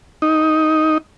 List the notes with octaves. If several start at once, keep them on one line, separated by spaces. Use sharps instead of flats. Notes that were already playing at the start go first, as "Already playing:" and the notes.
D#4